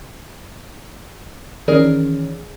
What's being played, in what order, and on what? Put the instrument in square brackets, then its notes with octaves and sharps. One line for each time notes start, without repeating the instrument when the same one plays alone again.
[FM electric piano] D#3 E3 C#4 [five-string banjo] G#4 A#4 D5